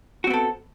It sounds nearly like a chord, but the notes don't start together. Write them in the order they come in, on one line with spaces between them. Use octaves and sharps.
F#4 C4 B3 A4